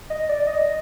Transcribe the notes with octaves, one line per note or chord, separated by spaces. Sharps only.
D#5
D5
D#5